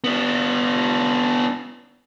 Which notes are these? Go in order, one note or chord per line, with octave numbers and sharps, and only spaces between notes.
B3 D4